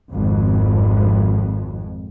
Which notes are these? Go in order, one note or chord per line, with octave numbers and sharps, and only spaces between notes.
G#1 F2